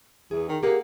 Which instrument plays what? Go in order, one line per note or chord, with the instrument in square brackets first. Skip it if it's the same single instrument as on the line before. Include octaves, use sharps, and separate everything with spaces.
[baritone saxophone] E2 [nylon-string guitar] G#4
[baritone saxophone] D#3
[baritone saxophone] A#3 [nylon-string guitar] G4 G#4 F#5